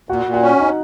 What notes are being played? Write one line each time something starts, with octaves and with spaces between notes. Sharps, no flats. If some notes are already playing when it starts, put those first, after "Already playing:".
A#2 F#4 F#5
A#2
F#4 F#5
C#4
D#4 D#5